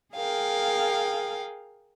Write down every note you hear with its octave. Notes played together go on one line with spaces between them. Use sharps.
G#4 A#4 F5 G5